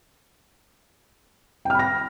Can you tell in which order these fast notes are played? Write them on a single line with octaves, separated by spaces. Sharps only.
G5 F6 B5 A#6